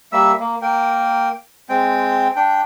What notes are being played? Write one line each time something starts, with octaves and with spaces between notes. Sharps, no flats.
G3 A#3 E5 E6
A#3
A#3 A#4 G5
G#3 C4 G5
D4 G5